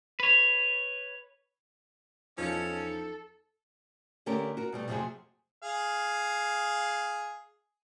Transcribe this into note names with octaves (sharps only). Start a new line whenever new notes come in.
B4 C#5
E2 F3 C#4 D#4 A4 C#7
D3 A3 C#4 G4 A#4
F#4 A#4
B2 G3 A3
F2 C3 F#3 G#3 A3 G#4
G#4 F5